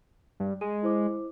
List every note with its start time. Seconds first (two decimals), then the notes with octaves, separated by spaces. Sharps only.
0.40 G2
0.61 G#3 D#7
0.83 E4 C5 D6